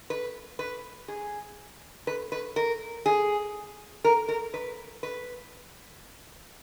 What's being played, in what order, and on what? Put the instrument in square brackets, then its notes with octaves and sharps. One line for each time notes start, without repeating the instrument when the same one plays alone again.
[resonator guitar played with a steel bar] B4
B4
G#4
B4
B4
A#4
G#4
A#4
A#4
B4
B4